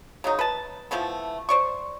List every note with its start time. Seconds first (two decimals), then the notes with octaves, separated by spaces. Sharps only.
0.24 C#3 F#3 D#4
0.39 B4 A5
0.91 E3 F3 A3 B3
1.49 C5 D5 C#6